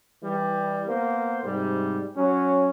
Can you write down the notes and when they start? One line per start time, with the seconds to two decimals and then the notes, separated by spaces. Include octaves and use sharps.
0.21 E3 G3
0.87 A#3 B3 C5
1.44 G#2 C3 G3
2.15 F#3 C#4